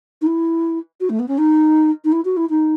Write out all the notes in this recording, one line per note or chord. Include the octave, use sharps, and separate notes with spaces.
D#4
E4
F#4
A3
B3
C#4
D#4
D#4
E4
F#4
E4
D#4